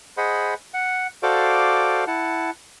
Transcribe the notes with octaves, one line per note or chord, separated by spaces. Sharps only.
G#4 C5 D#5 F#5 B5
F#5
F#4 A4 C5 D5 F5 D6
E4 F#5 A5